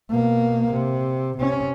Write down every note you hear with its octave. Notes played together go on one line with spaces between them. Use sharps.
B2 A#3
C3
C3 C#4